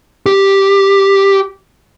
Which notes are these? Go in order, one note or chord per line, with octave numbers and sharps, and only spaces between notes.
G4